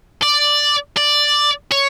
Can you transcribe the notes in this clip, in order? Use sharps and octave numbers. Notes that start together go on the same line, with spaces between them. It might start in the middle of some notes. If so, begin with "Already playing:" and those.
D5
D5
C#5